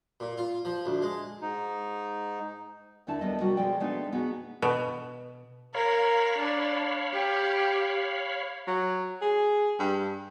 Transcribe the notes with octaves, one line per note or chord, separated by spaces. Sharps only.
A#2
F4
F3
D2
G#3
G#2 D#4
D#2 D3 A3 D4 E4 A5
D#2 G3 B3 A4 D#5
C3 G3 F#4 A#4
B2 F3 G#3 A4 D5 G5
G#3 A3 B3 D4 D#4 B4
B2 B3 D#4 F#4 G#4
B2
A#4 C#5 F5 B5
D4
G4
F#3
G#4
G2